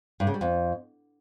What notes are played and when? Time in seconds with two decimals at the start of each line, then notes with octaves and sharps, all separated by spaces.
0.20 G2
0.27 C#3
0.34 G3
0.41 F2